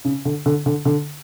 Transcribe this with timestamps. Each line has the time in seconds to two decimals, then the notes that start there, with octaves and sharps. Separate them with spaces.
0.05 C#3
0.25 D3
0.46 D3
0.66 D3
0.85 D3